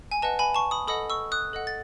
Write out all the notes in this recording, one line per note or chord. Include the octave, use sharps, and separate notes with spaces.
G#5
B4 D#5 F#5 A5
G#5 B5
A5 C#6
B5 D#6
A4 D#5 F#5 B5 D#6
C#6 E6
D#6 F#6
A4 D#5 F#5
A6